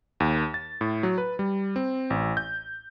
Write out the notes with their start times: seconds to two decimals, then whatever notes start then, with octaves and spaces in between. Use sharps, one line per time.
0.20 D#2
0.54 A6
0.81 A2
1.03 F#3
1.18 B4
1.39 G3
1.76 C4
2.10 A1
2.37 G6